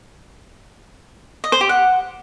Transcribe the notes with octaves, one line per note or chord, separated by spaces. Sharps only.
D#5
C5
G4
F#5